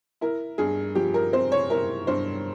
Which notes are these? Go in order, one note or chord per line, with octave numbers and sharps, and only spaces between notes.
E4 A#4
G2 G#4
F3 G4
A#4
C4 C5
C#5
E4 A#4
G2 C5